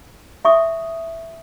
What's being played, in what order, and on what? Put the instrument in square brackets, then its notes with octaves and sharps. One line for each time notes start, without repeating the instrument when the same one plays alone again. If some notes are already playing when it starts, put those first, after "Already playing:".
[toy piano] E5 C#6 D#6